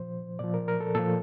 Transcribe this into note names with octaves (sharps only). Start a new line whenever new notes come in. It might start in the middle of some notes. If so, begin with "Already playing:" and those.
Already playing: A#2 F3 C5
A#2 F3 D5
A#4
A#4
A4
A#2 F3 A4